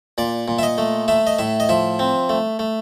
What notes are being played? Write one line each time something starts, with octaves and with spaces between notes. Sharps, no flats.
A#2 D5
A#2
E5
D#5
A3
A3 E5
D#5
A2 E5
D#5
F3 E5
C4
A3
A3